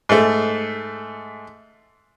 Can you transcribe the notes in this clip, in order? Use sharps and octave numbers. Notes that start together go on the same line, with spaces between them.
G#2 A3